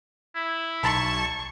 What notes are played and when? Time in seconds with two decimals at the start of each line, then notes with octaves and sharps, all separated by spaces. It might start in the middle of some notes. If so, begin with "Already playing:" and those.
0.35 E4
0.83 B1 A5 C#6